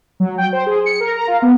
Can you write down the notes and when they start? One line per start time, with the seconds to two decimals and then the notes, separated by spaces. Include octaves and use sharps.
0.20 F#3
0.38 G5
0.53 C5
0.66 G#4
0.86 C#7
1.00 A#4
1.13 A#5
1.27 F4
1.42 B3